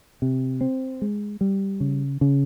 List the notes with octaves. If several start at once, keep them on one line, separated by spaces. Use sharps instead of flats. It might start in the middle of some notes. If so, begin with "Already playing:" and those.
C3
C4
G#3
G3
C#3
C#3